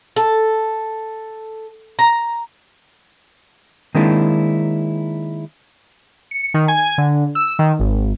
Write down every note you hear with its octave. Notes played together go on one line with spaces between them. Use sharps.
A4
A#5
D#3 G#3 A#3 C4 D4 E4
C#7
D#3
G#5
D3
E6
D#3
G#1